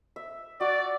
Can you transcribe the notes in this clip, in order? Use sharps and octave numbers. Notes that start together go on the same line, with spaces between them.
E5
F#4 D5